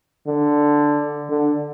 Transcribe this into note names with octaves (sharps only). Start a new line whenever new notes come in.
D3
D3